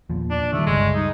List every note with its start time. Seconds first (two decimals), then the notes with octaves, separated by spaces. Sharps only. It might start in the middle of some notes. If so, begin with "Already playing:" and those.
0.10 E2 A#2 F3
0.30 D4
0.53 D#3 G3 A3
0.67 G1 C#2 G#3
0.95 G3 D#4